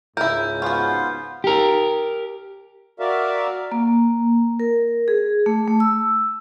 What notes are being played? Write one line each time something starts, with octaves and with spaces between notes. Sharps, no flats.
C#2 G#2 E4 A#4 G6
B3 C#4 F4 F#4
G4 A#4
F#4 A#4 D5 E5 F5
A#3
A#4
G#4
A3
A3
E6